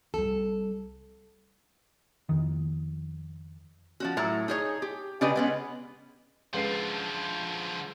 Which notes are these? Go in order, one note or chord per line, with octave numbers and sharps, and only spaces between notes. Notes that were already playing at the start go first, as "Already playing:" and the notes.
C2 G3 A4
F2 D#3
F3 C#4 F#4
A2 F#3 A#5
D#4 G#4 C#5
G4
C#3 D4 G4 B4 D#5
G#3 B3 C#4
C#2 D3 F3 B4 C7